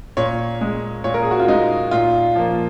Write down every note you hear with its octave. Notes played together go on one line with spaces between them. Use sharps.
A#2 C#5
G#3
A#2 C#5
A#4
G#4
F#4
F4
G#3 D#4
A#2 F4
F3 A#3